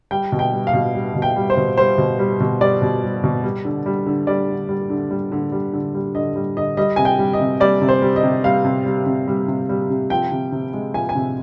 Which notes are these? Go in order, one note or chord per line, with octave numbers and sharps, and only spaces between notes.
G3 G5
B2
G5
G3
F5
B2
G3
B2
G5
G3
C5
B2
G3 C5
B2
G3
B2
G3 D5
B2
G3
B2
G3
D3
G3
D3
G3 D5
D3
G3
D3
G3
D3
G3
D3
G3
D3 D#5
G3
D3 D#5
G3 D#5
C3 G#5
G5
G3
D#5
C3
G3 D5
C3
C5
G3
D#5
C3
G3 F5
C3
G3
C3
G3
C3
G3
C3
F3 G5
C3
C3
G#3
F3 G#5
G#5
C3